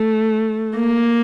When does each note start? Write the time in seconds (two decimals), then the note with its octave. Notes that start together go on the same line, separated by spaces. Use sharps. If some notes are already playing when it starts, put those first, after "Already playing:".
Already playing: A3
0.76 A#3